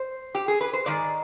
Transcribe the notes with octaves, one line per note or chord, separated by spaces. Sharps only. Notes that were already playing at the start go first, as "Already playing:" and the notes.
Already playing: C5
G4
G#4
B4
C5
G#2 D#3 G#3 D5